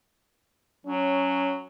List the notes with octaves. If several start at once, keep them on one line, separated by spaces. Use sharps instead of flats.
F#3 C#4